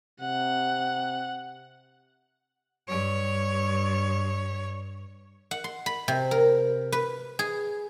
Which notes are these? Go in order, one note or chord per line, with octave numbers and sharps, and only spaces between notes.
C3 F#5
G2 C#5
F#5
C6
B5
C3
A#4
B4
G#4